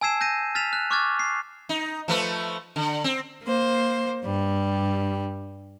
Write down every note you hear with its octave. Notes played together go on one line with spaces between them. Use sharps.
G#5 A5 E6 G#6 C7 E7
G6 A#6 D#7
F6 A6 B6 E7 F7
F#6
C#6 D6 F6 F#6 G#6 A6
C7
D#4
F3 A3 B4
D3
C4
A#3 C5
G2 G3